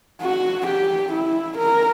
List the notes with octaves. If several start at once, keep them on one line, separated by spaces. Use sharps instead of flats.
F#4
G4
E4
A#4